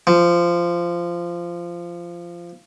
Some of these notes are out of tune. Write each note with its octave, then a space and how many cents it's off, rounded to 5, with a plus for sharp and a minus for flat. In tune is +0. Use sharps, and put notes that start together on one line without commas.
F3 -15